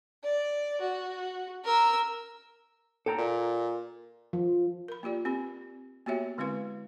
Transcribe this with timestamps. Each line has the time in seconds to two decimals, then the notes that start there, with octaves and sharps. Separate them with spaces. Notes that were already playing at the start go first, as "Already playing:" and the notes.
0.23 D5
0.81 F#4
1.65 A#4 E6
3.06 A4 G5 A#5
3.18 A#2
4.33 F3
4.88 A#4 B5
5.03 A#3 F4 G4 D5
5.25 C4 G4 B5
6.06 A#3 B3 F#4 G4 C#5 E5
6.38 D3 G#3 C4 E4 B4 F5